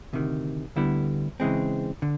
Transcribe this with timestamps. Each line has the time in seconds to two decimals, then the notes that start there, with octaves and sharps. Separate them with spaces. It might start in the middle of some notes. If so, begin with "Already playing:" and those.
0.13 D2 C3 D#3
0.76 D2 D3 G3 B3 E4
1.40 C#3 E3 G#3 C4
2.02 D3